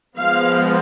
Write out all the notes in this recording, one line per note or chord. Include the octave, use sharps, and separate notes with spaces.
F3 G#3 B3 F5